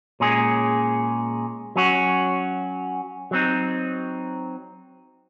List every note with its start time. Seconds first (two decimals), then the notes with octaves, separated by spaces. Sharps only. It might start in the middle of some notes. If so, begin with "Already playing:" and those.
0.20 A#2 G#3 C#4 G#4
1.76 F#3 C#4 F#4
3.31 F#3 C4 D#4